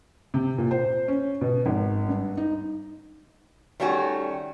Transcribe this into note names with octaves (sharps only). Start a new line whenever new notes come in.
C3
A#2
C5
C#4
B2
G#1
G2
D#4
D#3 G3 A3 C#4 F#4